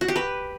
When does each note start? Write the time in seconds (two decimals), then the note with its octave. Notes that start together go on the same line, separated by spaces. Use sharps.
0.01 F#4
0.08 G4
0.16 B4